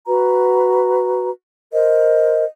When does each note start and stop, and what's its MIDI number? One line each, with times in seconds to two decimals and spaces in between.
0.07 1.30 66
0.07 1.30 71
0.07 1.30 82
1.73 2.45 70
1.73 2.45 72
1.73 2.45 75